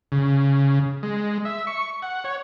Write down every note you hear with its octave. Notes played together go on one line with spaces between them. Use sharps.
C#3
G#3
E5
C#6
F#5
C#5